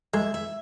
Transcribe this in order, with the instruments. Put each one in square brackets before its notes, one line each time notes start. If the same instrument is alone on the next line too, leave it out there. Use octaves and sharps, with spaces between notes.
[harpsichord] G#3 [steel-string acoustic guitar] E5
[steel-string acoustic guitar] E5